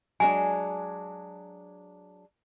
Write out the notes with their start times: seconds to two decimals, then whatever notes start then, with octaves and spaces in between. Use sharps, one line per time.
0.20 F#3 G#3 D4 G#5